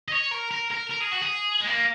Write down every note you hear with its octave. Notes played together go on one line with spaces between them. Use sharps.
D#5
C#5
A#4
A#4
A#4
A#4
G#4
F#4
G#4
G#3
A#3